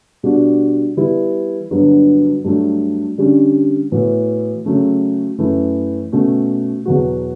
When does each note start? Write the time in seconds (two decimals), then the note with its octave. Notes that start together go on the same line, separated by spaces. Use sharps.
0.23 B2 G3 D4 F#4
0.97 E3 G3 B3 E4
1.71 G2 D3 F#3 B3 F#4
2.44 G2 F#3 A3
3.17 D3 G3 C#4
3.92 A2 E3 B3 F#4
4.65 C#3 F#3 A3 C#4
5.38 F#2 E3 A3 E4
6.12 B2 A3 C#4
6.85 E2 B2 F#3 B3 F#4